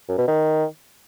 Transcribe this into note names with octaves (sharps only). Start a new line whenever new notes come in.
F#2
B2
D#3